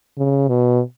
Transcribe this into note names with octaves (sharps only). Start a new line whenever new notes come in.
C#3
B2